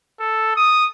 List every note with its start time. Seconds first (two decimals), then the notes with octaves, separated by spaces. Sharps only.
0.19 A4
0.56 D#6